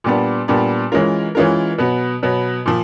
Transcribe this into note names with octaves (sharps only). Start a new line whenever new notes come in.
A#2 G3 B3 D4
A#2 G3 B3 D4
E3 G#3 C#4 F4 A#4
E3 G#3 C#4 F4 A#4
B2 F#3 B3
B2 F#3 B3
A#2 F3